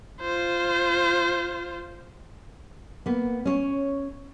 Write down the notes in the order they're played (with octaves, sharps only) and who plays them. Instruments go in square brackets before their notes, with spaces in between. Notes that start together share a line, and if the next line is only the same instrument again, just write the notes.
[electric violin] F4 C5
[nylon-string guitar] A#3 B3
C#4 C#5